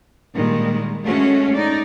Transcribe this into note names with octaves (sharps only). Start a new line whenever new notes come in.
A#2 D#3 G3 G#3
G#3 A3 C#4 F#4
D#4 D5